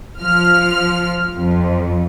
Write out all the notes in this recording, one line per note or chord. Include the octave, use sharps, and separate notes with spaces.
F3 F6
F2